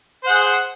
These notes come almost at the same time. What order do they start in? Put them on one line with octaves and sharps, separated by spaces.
C5 F#5 G#4